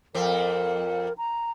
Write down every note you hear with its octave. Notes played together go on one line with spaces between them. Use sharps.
F2 C4 A#4
A#5